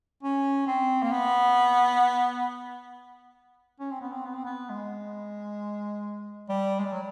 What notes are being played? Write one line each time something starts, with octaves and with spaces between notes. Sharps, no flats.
C#4
C4
A#3
B3
C#4
C4
B3
C4
B3
C4
B3
G#3
G3
G#3
G3
F#3